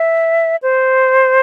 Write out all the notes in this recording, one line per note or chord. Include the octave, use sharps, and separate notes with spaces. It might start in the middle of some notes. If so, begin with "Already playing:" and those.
Already playing: E5
C5